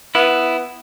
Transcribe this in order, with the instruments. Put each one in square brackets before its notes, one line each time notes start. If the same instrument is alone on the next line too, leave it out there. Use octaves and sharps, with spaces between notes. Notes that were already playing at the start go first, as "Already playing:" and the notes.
[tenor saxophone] B3 [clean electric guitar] E4